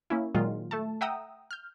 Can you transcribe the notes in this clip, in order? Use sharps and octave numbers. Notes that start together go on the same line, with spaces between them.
A#3 C#4 E4
A#2 D#3 F#3 G#3 F4
A3 A4 A5
E5 F#5 G5 A#5 D#6 E6
F6 G6